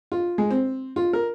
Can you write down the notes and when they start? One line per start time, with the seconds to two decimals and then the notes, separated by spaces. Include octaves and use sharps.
0.12 F4
0.38 G#3
0.51 C4
0.96 F4
1.13 A#4